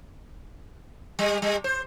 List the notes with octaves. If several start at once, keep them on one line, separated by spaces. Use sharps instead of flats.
G3
G3
C5